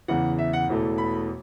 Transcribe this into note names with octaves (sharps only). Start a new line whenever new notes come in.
E2 C#3 E3 F#5
E5
F#5
E1 E2 E3 A3
B5